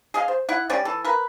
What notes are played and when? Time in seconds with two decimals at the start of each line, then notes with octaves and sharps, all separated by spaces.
0.14 G#4 D#5 F5
0.28 C5
0.49 E4 F#5
0.70 G3 G#3 C#4 D5
0.85 E3 A4
1.05 A#4 B4